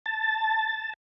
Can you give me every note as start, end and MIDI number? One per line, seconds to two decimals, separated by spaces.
0.06 0.93 81